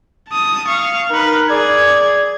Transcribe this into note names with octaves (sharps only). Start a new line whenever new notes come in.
A5 D#6
F5 C#6
D#4 A#4 B4
G#4 D5 G#6